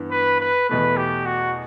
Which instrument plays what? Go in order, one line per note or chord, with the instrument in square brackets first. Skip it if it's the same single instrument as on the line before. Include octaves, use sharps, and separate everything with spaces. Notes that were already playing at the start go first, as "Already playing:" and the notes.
Already playing: [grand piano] G2 E3 B3
[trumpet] B4
B4
[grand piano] E2 B2 A3 [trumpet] B4
[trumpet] G4
F#4